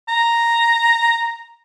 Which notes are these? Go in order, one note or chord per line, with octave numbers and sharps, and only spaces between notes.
A#5